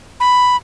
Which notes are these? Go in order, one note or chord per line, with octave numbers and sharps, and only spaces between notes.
B5